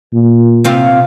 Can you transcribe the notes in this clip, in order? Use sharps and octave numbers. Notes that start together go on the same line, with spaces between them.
A#2
C3 C4 F4